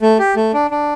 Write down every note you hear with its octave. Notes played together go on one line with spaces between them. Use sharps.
A3
G4
A3
D4
D4